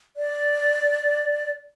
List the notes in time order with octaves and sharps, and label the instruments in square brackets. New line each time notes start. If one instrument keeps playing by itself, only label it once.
[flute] D5